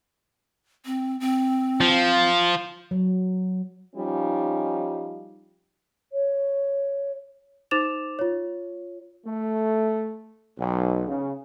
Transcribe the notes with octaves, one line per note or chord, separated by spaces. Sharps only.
C4
C4
F3
F#3
F3 G3 C#4 D#4
C#5
D#4 C5 D6 A6 E7 F7
F4 C#5
A3
B1
C#3